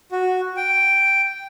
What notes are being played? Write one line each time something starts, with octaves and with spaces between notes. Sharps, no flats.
F#4
G5